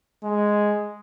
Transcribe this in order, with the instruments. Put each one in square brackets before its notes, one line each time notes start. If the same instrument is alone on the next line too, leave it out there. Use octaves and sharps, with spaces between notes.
[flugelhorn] G#3